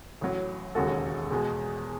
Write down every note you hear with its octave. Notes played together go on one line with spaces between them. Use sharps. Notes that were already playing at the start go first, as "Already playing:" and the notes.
A1 A2 F#3
E1 D#2 C#3 G#3 F#4 A4
E2 B2 G#3